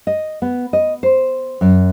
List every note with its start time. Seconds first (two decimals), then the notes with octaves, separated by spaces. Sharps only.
0.07 D#5
0.42 B3
0.73 D#5
1.03 C5
1.61 F#2